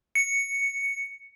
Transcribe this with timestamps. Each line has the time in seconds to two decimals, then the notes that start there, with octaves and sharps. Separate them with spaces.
0.15 C#7